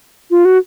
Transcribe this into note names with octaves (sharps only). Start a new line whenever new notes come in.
F4
F#4